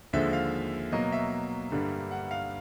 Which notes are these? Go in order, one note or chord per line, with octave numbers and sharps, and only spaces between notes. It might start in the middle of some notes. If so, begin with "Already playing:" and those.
D#2 D3 F3 G#3 E5
F5
B2 F#3 A#3 D#5
E5
G2 D3 G3 A#3
F#5
F5